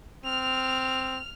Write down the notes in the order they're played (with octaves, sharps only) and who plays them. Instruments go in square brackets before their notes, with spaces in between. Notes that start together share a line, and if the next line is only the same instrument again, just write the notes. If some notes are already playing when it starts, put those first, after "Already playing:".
[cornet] C4 [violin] F6 F7